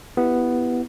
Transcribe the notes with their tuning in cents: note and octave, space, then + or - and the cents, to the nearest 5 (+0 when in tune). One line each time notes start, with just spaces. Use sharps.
B3 +0 E4 +0 G4 +0